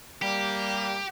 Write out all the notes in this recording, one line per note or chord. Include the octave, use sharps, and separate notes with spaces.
G3 A#3 G4